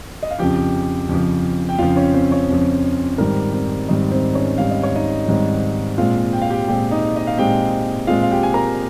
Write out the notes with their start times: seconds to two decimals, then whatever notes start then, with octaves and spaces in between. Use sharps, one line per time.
0.23 D#5
0.31 F5
0.39 F2 C#3 F3 G4 G5
1.09 F2 C#3 F3
1.69 G5
1.79 F2 C#3 F3 F4 F5
1.96 C#4 C#5
2.14 C4 C5
2.31 C#4 C#5
2.49 F2 C#3 F3
3.18 G#2 D#3 G3 C4 A#4
3.53 C4 C5
3.89 G#2 D#3 G3 C4 D#4 D#5
4.11 C4 C5
4.35 C#4 C#5
4.58 G#2 D#3 G3 C4 F5
4.71 D#5
4.83 C#5
4.96 D#4 D#5
5.28 G#2 D#3 G3 C4
5.98 A#2 G#3 C4 F4 F5
6.33 G5
6.42 F5
6.50 G4 G5
6.68 A#2 G#3 C4 G4 G5
6.91 D#4 D#5
7.16 D#5
7.27 F5
7.37 A#2 G#3 C4 G4 G5
8.07 A#2 G#3 C4 F4 F5
8.23 F5
8.31 G4 G5
8.43 G#5
8.54 A#4 A#5